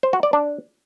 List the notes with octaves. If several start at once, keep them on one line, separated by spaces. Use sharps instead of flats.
C5
F#4
D5
D4